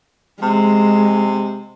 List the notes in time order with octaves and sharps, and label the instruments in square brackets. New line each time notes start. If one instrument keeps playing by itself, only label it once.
[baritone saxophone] C3 [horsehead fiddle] G#3